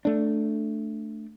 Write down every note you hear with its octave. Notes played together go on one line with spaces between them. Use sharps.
A3 D4